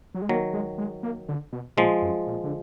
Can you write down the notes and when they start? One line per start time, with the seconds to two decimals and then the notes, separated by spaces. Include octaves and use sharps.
0.15 F#3
0.22 G#3
0.29 D#3 F#3 A#3
0.54 G#3
0.78 G#3
1.03 A#3
1.29 D3
1.53 B2
1.77 A#2 F3 G#3
2.02 F#2
2.27 A#2
2.44 D3